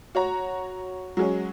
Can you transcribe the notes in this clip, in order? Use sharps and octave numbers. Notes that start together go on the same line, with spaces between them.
F#4 C#5 A#5
F#3 G#3 C#4